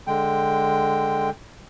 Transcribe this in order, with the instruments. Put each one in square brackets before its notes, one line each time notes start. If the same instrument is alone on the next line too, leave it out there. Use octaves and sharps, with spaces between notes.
[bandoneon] D3 G#3 G5